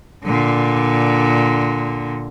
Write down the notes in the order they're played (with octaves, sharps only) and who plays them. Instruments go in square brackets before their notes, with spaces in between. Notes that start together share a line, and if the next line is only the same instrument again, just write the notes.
[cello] A#2 D3